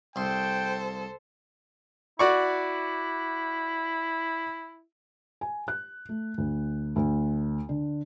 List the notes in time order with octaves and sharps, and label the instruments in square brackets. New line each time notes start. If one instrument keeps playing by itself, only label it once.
[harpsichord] C2 C6 [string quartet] A4 C5 [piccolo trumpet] G5
[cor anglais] E4 [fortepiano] F#4 D5 C#6
[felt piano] G#5
F#6
A3
D2
D2
D3